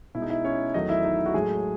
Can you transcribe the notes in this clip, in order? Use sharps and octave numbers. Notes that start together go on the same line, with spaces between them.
B2 G#3 D#4 E4
E4
C#4 C#5
E2 D#3 F#3 A3 D#4 D#5
E4 E5
D#4 D#5
F#4
A2 F#3 G#3 A3 G#4